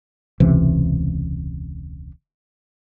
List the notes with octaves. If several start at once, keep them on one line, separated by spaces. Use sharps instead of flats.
E1 C#2 C3 E3